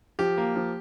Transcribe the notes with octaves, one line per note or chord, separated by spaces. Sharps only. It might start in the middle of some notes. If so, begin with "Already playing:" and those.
F3 G4
A#3
F3